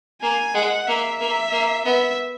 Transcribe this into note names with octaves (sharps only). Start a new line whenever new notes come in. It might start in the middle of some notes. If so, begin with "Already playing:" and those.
A#3 G#5
G#3 F#5
A#3 E5
A#3 E5
A#3
B3 E5